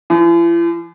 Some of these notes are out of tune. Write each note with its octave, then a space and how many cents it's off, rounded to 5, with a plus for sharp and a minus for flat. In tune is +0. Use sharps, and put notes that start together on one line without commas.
E3 +45